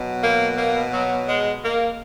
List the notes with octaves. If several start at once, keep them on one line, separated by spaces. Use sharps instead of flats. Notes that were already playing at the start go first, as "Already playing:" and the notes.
Already playing: B2 F#3
A#3
A#3
F#3
G#3
A#3